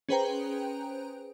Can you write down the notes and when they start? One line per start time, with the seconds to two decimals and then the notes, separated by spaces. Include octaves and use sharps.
0.09 C#4 G#4 B4 C5 G5 A#5